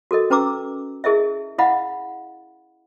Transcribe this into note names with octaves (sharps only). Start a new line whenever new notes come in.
F#4 A4 A#4 D#5
C#4 B4 A#5 D6 E6
E4 G#4 A#4 D#5 E5
E4 D#5 F5 F#5 B5